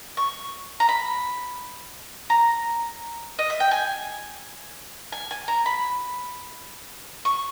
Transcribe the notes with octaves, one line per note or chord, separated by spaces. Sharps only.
C#6
A#5
B5
A#5
D#5
E5
G5
G#5
G#5
G#5
A#5
B5
C#6